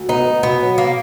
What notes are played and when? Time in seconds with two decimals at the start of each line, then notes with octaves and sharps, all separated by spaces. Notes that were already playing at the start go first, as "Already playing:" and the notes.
Already playing: D2
0.09 B3 D#4
0.27 B3
0.43 B2 B3
0.61 F#3
0.78 B2 A#3